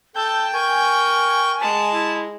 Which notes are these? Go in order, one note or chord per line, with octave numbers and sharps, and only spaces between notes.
A4 G5 A5 G6
A#4 G#5 C#6
G#3 A5
E4